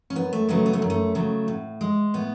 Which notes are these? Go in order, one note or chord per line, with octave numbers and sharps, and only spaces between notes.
C#4
F#2 B3
A3
C#3 F#3 A3 B3
B3
A3
F#2
A3
C#3 F#3 A3
A2
G#3
A2 B3